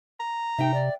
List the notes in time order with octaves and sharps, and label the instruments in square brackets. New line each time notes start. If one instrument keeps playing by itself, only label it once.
[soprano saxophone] A#5
[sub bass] C3 [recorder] D#4 [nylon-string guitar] E5 G5
[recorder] D5